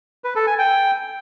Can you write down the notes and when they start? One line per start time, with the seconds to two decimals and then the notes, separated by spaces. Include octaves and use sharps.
0.24 B4
0.36 A4
0.47 G#5
0.58 G5